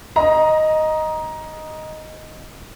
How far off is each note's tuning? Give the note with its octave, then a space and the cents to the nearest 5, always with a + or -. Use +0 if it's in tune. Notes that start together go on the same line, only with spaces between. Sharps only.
D#5 +0 A#5 +15